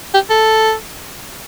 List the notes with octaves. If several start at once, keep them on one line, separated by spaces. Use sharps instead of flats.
G4
A4